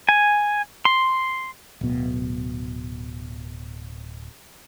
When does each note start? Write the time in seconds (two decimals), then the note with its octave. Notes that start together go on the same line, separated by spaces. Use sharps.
0.09 G#5
0.85 C6
1.81 D1 B2